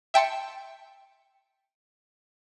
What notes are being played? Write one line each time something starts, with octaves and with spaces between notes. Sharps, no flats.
E5 G5 A5 C6 C#7